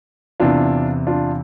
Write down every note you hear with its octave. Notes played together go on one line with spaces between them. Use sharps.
E2 C3 E3 D4 F4
D4 F4